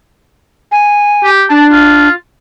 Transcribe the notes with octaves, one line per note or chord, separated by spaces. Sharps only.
G#5
G4
D4 A5
F4